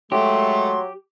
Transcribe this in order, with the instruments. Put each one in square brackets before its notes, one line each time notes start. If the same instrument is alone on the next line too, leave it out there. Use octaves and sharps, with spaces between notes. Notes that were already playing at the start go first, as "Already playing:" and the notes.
[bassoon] F#3 [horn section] G#3 A3 [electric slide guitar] G4 [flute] C6